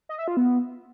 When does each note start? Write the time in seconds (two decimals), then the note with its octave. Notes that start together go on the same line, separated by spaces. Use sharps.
0.09 D#5
0.18 E5
0.28 F4
0.37 B3